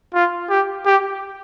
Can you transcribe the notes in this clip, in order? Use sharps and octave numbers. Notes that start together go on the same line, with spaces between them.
F4
G4
G4